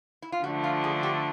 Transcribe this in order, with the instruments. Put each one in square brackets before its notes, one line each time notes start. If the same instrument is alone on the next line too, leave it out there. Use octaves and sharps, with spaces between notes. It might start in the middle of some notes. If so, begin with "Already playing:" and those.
[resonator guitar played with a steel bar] E4
F4
[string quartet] D3 F3 A3 D4 [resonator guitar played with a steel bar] F#4
[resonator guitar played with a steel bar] F4
G#4
G4